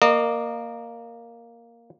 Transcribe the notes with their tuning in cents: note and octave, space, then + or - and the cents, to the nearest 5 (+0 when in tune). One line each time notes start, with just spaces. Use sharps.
A#3 +0 D#5 -30